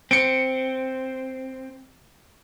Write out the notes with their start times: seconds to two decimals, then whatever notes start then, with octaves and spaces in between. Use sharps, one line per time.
0.11 C4 C#7 D7